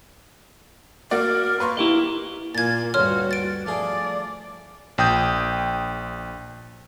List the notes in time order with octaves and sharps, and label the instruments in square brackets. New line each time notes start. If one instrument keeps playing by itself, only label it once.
[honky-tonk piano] A#3 F#4 D5 [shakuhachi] A#4
[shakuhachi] A#3 [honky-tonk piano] B4 C6 C#6
[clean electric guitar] E4 G4 D#5
[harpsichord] A#2 G#5 [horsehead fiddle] A#3 F4 [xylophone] G#6 A6
[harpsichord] D2 G2 [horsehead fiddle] F#4 [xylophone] C#5 C6 F6
[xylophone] A6 D7
[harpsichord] F3 A3 G#4 [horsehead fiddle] D5
[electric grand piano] A#1 G5 D#6 G6